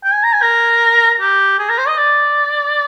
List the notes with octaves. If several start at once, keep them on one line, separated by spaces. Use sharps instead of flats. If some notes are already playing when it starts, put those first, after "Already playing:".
G5
G#5
A#5
G#5
A#4
G4
G#4
A#4
C5
D#5
D5